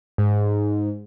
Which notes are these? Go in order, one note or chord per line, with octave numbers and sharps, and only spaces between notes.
G#2